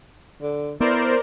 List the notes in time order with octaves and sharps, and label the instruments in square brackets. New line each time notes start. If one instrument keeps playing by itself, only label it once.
[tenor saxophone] D3
[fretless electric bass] B3 [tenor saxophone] E4 [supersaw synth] A#4 C5 D5